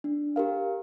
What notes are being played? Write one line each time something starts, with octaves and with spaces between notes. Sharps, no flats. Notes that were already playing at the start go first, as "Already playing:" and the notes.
D4
G4 A#4 F5